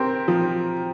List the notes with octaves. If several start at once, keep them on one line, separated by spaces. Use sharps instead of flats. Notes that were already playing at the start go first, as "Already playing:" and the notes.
Already playing: C4 G4 A#4
F3